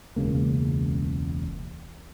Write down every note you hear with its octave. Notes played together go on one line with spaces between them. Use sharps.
E1 C#2 C#3 A#3